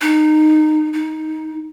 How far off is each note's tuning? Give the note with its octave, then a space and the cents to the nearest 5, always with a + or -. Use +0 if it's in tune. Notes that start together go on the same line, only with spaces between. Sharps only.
D#4 -20
D#4 +10